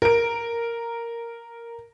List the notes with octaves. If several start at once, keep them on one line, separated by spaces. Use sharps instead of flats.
A#4 D7